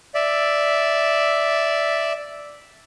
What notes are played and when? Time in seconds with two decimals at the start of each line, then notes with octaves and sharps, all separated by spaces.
0.14 D5 E5